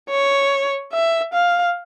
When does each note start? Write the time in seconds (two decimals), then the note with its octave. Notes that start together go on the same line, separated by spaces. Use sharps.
0.10 C#5
0.93 E5
1.34 F5